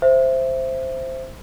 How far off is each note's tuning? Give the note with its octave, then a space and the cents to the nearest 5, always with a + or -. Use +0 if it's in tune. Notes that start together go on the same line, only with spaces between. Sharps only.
C5 +0 E5 +10